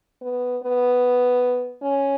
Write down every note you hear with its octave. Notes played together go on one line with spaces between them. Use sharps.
B3
B3
C#4